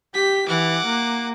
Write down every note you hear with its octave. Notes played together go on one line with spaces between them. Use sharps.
G4 B6
E3 F#5 D6
A#3